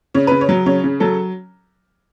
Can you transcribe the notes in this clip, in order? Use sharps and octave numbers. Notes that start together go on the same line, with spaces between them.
C#3 C#5
C#3 B4
C#5
F#3
C#3 C#5
C#3
F#3 A4